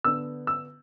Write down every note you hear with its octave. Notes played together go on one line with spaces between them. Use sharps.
D3 B3 D4 E6
E6